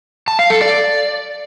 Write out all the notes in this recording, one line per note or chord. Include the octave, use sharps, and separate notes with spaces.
A5
F5
A4
D5